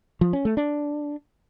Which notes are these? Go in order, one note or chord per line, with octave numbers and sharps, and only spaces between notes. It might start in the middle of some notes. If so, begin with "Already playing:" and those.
F3
C#4
A3
D4